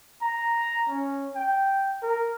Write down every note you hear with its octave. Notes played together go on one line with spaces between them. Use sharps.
A#5
C#4
G5
A#4